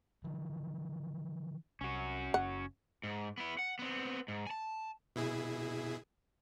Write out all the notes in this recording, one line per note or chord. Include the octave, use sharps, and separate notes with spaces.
D3 E3 F3
C2 C#4 F#4
F#1 F#5
G#2
B3 E4
F#5
B3 C4
G#2
G#5 A5
B2 E4 G#4